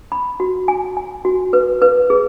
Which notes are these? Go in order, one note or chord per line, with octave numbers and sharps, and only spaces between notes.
B5
F#4
G#5
G#5
F#4
B4
B4
G#4